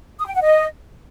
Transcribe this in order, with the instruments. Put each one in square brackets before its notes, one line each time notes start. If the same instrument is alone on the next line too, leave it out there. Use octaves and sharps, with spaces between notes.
[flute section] D#6
G5
F#5
D#5